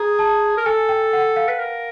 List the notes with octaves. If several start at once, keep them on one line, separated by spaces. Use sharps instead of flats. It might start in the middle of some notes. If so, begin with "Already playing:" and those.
Already playing: G#4 A#5
A5
A#4
A4 G#5
G5
F#5
F5
B4
A#4